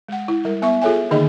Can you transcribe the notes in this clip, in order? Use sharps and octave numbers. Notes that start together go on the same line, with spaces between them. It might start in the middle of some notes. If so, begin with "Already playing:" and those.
G#3 F#5
E4
G3 A#4
B3 E5 C#6
F4 G#4 A4 C#5 E5 G#5
D3 D#3 A#3 D#4 G#4 D#5